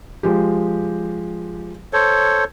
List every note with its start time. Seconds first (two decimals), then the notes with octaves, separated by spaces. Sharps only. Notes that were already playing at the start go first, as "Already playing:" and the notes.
0.23 F3 G#3 G4
1.93 A4 C5 C#5